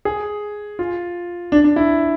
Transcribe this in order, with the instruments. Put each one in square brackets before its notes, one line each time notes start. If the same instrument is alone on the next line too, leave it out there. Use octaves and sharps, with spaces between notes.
[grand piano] G#4
F4
D4
D4
E4